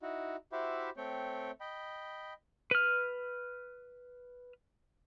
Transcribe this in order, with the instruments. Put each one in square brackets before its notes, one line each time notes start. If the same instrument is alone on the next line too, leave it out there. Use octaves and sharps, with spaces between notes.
[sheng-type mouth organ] D#4 E4 F#4
E4 F#4 G4 C5 E5 B5
A3 C4 C#5 G5
D#5 G5 B5
[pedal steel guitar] B4 F6